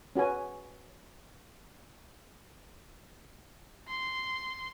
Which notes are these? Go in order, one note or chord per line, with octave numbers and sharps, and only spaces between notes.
C#4 F#4 B4 G#5
C6